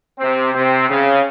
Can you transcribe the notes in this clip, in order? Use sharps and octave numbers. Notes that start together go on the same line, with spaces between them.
C3 C4
C3 C4
C#3